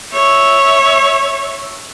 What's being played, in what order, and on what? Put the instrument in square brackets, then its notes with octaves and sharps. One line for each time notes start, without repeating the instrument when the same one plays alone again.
[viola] C#5 E5